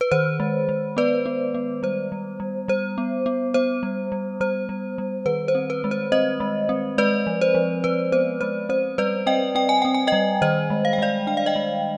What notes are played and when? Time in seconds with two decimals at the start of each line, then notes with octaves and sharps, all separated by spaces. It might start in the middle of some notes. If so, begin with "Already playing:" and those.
0.01 B4
0.11 D#3 C5
0.40 G#3
0.69 G#3
0.97 B3 B4 D5
1.26 B3
1.54 B3
1.83 G3 C5
2.12 G3
2.40 G3
2.68 G3 C5
2.98 B3
3.26 B3
3.54 B3 C5
3.83 G3
4.12 G3
4.40 G3 C5
4.69 G3
4.98 G3
5.26 D#3 B4
5.48 C5
5.55 C4
5.70 B4
5.84 G#3
5.91 C5
6.12 C4 C5 D#5
6.40 G#3
6.69 C4
6.98 G#3 B4 D5
7.27 F3
7.41 C5
7.55 F3
7.84 F3 B4
8.12 B3 C5
8.41 G#3 C5
8.69 C4 C5
8.98 G3 B4 D5
9.26 C4 D#5 G5
9.55 C4 G5
9.69 G#5
9.82 C4 G5
9.94 G#5
10.07 G3 D#5 G5
10.42 D#3 C5 D#5
10.70 G#3
10.85 F5
10.93 G5
10.98 G#3 D5 F5
11.27 D4 G5
11.37 F5
11.46 D#5 G5
11.56 G#3